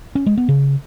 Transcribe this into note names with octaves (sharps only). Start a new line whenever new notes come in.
C#4
G#3
B3
C#3